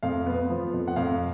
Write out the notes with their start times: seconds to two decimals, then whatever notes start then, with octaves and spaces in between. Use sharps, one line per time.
0.03 F2 F5
0.26 B3
0.50 F3
0.73 F2
0.88 F#5
0.96 F2 F5